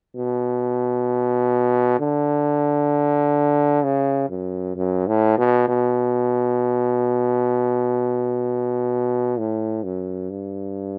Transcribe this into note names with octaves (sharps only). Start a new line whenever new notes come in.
B2
D3
C#3
F#2
F#2
A2
B2
B2
A2
F#2
G2